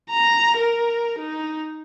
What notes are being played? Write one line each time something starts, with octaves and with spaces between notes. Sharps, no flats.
A#5
A#4
D#4